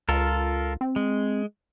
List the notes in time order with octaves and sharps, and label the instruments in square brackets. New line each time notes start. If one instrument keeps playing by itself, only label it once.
[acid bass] C#2 [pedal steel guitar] F4 A4 A#4
[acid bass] C4
[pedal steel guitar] G#3